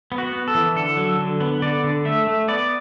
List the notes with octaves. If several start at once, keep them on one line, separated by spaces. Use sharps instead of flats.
B3
F#4
B3
A4
E3
D3 A4
F#3
D3
B3
D3 D5
D3
A3 E5
A3
B3 D5